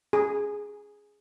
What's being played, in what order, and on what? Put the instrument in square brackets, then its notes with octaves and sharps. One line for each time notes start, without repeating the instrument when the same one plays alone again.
[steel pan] G#4